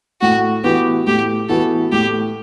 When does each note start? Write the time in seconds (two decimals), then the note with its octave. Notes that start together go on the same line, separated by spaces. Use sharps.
0.21 A2 F#4
0.64 E3 B3 F#4 G4
1.07 A2 G4
1.49 E3 B3 F#4 A4
1.92 A2 G4